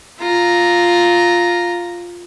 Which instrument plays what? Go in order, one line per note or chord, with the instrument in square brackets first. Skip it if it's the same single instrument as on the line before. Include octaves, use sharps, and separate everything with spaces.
[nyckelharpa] F4 A#5